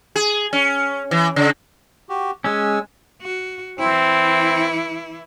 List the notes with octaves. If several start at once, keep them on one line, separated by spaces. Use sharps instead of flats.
G#4
C#4
E3
C#3
F#4 G4
G#3 C#4 G#5 E6
F#4
E3 C4 E4